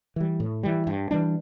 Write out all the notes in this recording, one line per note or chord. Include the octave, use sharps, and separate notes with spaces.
E3 G3
A2
E3 G3
G2
E3 G3 D4